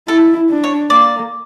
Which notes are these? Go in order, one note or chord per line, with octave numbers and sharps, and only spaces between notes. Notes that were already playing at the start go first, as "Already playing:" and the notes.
E4 A4
D4
C#5
A#3 D5